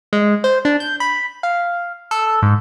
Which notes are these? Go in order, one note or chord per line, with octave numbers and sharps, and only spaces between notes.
G#3
C5
D4
G6
B5
F5
A4
G#2